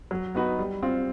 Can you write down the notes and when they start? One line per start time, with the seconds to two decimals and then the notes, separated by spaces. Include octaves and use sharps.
0.11 F#3
0.35 B3 D#4 F#4 B4
0.59 G3
0.83 C4 F4